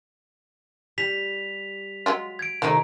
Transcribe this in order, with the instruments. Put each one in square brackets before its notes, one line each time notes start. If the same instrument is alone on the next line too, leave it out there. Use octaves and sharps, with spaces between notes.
[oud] G3 [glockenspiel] B6 F7
[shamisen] F#3 G#3 F4
[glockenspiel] G#6 D7
[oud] C3 D#3 D#4 [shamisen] F3 A3